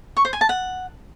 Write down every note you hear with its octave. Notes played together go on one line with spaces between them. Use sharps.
C#6
C5
G#5
A5
F#5